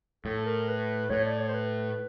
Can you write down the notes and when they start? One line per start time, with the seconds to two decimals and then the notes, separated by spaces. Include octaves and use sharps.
0.25 A2 A4
0.45 A#4
0.68 B4
1.10 A2 C#5
1.25 D5
1.39 C#5
1.48 C5
1.53 B4